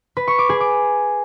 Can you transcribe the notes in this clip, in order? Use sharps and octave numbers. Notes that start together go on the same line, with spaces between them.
B4
C#6
D6
G#4
D6